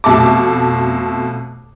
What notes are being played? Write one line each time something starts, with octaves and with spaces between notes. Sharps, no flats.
F2 B2 A3 A5 D6